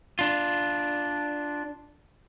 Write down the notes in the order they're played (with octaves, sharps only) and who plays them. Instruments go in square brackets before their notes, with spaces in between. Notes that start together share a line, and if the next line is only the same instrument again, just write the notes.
[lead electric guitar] D4 F4